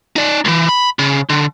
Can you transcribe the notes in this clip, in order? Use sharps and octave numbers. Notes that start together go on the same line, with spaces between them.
D#4 D5
C#2 E3
B5
C#3
D3